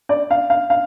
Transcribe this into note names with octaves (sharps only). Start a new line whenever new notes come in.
D5
F5
F5
F5